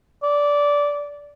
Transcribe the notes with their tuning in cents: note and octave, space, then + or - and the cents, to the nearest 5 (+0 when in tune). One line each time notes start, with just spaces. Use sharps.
D5 -15